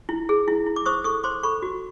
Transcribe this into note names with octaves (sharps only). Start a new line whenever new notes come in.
E4
G#4
E4
E4
D6
C5 C#6 D#6
A4 C#6 D#6
C5 C6 D6
A4 B5 C#6
F#4